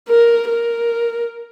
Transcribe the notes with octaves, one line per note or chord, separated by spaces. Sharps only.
A#4
A#4